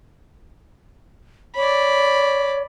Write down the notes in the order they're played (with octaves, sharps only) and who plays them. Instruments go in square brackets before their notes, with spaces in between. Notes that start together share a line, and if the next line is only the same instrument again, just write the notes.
[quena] C#5 [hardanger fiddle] D5 B5